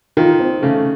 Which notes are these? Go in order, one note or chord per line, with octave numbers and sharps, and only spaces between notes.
D#3 F4
C4
C#3 A3